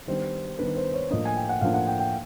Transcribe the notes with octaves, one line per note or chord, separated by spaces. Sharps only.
D#3 G3 B3 D4 C5
D#3 G3 B3 D4 B4
C5
C#5
A2 F3 A#3 D4 D#5
G#5
G5
F#5
A2 F3 A#3 D4 F5
F#5
G5
G5